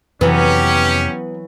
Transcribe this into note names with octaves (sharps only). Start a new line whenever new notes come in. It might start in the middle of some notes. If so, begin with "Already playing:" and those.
F2 C3 E3 F#3 B3 C#4 G4